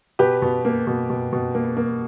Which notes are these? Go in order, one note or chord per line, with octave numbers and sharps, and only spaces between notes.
B2 G4 B4
B2
A#3
B2
B2
B2
A#3
A#3